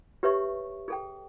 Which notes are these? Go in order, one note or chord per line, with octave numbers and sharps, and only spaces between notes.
G4 B4 C#5 E5 C#6
G#4 A4 G5